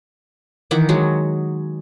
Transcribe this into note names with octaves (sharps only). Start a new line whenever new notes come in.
D#3 E3 F#5 D6
F#3 G#3 F#4